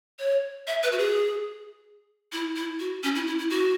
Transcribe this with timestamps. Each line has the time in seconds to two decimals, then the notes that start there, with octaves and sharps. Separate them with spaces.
0.19 C#5
0.67 E5
0.83 B4
0.92 F#4
0.98 G#4
2.32 E4
2.56 E4
2.80 F#4
3.03 C#4
3.15 E4
3.27 E4
3.39 E4
3.50 F#4